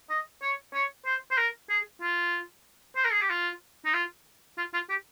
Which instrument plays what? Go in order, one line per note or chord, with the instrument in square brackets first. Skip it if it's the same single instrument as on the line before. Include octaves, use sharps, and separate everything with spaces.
[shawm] D#5
C#5
C#5
C5
C5
A#4
G#4
F4
C5
A#4
G#4
G4
F4
D#4
F4
F4
F4
G4